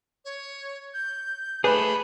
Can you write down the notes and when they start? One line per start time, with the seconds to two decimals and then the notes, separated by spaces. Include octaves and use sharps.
0.25 C#5
0.94 G6
1.64 A3 D4 G#4 B4 A5 B5